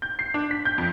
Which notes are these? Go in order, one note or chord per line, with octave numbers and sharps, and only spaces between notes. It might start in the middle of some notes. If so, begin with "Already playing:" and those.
G6
C7
D4
B6
G6
F2